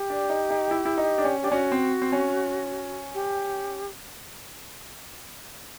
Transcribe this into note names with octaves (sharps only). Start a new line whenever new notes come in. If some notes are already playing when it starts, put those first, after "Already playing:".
Already playing: G4
D4
D#4
D#4
E4
E4
D#4
D4
C#4
D4 G4
C#4 F#4
C4
C4
C#4
G4